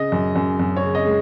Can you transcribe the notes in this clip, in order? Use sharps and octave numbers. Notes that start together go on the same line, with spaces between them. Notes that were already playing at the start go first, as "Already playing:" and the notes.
Already playing: C#3 D#5
F#2
F#2
F#2
C#5
C#3
D#5
G#3